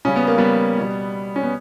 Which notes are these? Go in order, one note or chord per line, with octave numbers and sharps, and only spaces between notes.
C#3 G3 C#4
B3
A#3
G3 B3
B2 G3
C#4
B3